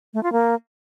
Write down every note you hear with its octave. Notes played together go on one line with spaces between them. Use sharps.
A3
F4
A#3